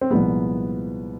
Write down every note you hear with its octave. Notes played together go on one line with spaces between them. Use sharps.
C4
C2 A#2 F3 G#3 B3